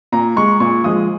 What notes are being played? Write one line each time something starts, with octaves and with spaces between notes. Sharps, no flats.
A#2 A#5
G#3 C#6
A#2 C#6
F3 G#3 D#6